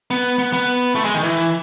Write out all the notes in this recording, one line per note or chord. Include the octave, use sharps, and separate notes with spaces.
B3
B3
B3
A3
G#3
D#3
E3